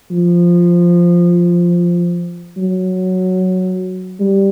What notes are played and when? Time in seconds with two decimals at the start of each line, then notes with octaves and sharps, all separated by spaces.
0.11 F3
2.57 F#3
4.20 G3